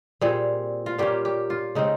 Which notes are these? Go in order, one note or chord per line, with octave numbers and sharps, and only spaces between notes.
A#2 G3 C4 G#4
F4
A#2 G3 A#3 C#4 G4
G4
F4
C#3 G#3 C4 D#4